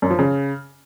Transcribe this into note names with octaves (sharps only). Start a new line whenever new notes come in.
F#2
F3
C#3